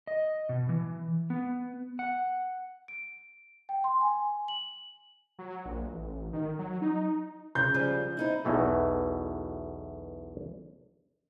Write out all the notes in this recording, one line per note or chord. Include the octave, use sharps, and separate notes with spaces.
D#5
B2
E3
B3
F#5
D7
G5
C6
G#5
F#7
F#3
A#1
A1
D#3
F#3
D#4
C#2 C#4 G6
C#3 F3 G3
C4 D#4 E4
B1 E2 B2 E3 A3